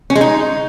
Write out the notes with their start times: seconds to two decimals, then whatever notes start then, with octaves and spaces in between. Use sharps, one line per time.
0.10 C#4
0.15 G#3
0.21 D#4